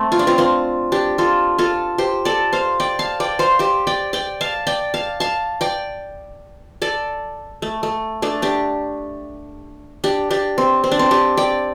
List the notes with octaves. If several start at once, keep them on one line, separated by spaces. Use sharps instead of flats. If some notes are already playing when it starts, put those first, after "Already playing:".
Already playing: A3 C4
F4
D4
C4 F4
C4 F4
D4 G4
F4 A4
F4 A4
G4 C5
A4 D5
C5 F5
D5 G5
F5 A5
D5 G5
C5 F5
G4 C5
D5 G5
D5 G5
F5 A5
D5 G5
F5 A5
F5 A5
D5 G5
A4 D5
A3
A3
A3 D4
D4 G4
D4 G4
D4 G4
C4
C4
D4
C4
D4 G4
D5 G5